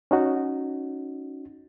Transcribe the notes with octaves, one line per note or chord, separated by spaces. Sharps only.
C#4 D#4 F#4